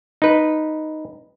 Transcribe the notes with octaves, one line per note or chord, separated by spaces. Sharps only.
D#4 B4